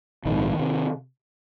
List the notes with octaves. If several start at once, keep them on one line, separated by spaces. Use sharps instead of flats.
A#1 G#2 D#3
C3